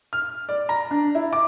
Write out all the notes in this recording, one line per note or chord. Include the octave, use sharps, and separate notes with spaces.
F6
D5
A#5
D4
E4
D6